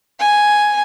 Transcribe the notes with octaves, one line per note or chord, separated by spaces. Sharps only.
G#5